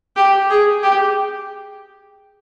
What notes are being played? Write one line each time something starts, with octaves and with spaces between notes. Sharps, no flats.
G4
G#4
G4